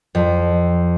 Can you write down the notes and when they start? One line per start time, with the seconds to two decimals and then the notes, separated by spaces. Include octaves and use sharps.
0.15 F2